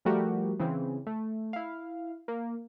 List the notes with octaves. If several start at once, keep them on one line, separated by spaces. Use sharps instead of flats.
F3 G3 A3 F#4 G4 A#4
C#3 E3 C4
A3
E4 F5
A#3